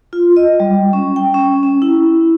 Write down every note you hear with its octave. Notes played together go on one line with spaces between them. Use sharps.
F4
D#5
G3
C#4
G5
C#4
C#4
E4